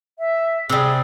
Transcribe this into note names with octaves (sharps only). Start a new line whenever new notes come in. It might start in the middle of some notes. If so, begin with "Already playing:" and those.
E5
C3 G3 G#4